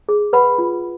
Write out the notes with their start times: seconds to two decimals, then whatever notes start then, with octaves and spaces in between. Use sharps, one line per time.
0.09 G#4
0.33 B4 F#5 B5
0.59 F4